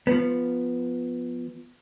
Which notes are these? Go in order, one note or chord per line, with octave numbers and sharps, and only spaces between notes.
F3 B3